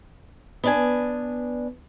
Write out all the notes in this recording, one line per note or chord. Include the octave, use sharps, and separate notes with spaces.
B3 D4 G#5